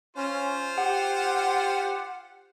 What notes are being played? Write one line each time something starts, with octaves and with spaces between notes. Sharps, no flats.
C#4 F4 C5
G4 F#5